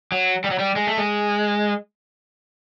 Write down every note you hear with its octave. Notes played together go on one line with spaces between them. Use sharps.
F#3
G3
F#3
G3
G#3
A3
G#3